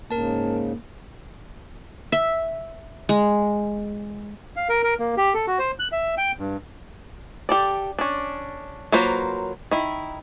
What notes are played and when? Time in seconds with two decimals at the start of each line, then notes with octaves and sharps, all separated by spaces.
0.11 G#2 C#3 A#3 A#4 A5
2.12 E5
3.09 G#3
4.56 F5
4.69 A#4
4.83 A#4
4.99 A#3
5.17 G4
5.34 A4
5.47 F#4
5.59 C5
5.79 F#6
5.92 E5
6.18 G5
6.39 G2
7.49 G4 A4 D5
7.99 C#4 D4
8.92 F#3 A#3 F4 B4 C5
9.71 D#3 E4